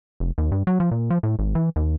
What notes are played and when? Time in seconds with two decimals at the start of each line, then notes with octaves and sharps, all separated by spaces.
0.20 F1
0.38 D#2
0.52 G2
0.67 F#3
0.80 F3
0.91 A#2
1.10 F3
1.23 A2
1.39 G#1
1.55 E3
1.76 D#2